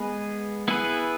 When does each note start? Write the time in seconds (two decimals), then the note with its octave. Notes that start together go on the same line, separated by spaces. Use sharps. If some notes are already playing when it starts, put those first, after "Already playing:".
Already playing: G#3 B3 G#4
0.68 B3 E4 G#4 B4